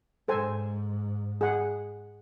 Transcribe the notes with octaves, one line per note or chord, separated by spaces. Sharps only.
G#2 A4 C5 G#5
G#4 F#5